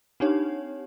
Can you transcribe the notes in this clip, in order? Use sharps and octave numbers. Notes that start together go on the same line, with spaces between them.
C4 D4 D#4 G4 C#5